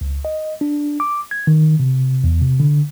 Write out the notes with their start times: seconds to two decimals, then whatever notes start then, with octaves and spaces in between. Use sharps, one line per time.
0.01 C#2
0.25 D#5
0.61 D4
1.00 D6
1.31 G#6
1.47 D#3
1.80 C3
2.24 E2
2.42 C3
2.60 D3